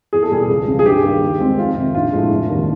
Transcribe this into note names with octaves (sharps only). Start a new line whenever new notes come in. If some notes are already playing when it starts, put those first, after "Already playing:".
E2 G#4
A4
B2 G3 G#4
C#2
C#3 F3
G#4
G2 G4
D#3 G3 A#3
D#2
D#3 G#3 C4
F2 F4
C3 D#3
A#1 F4
A2 F3 G#3
F1
D#2 D#3 G3 A#3